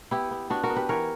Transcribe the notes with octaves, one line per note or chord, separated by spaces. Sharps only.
B3 E4 G4
B3
B3 D4 F#4
F#4 A#4
B3
G4 B4
E3 A#4 C#5